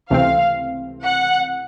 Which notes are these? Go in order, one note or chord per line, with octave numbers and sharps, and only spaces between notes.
C#2 C3 E3 A3 C4 F5
F#5